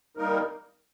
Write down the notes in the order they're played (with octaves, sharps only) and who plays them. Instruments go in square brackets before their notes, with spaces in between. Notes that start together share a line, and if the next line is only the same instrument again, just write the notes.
[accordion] G3 A#3 D#4 A#4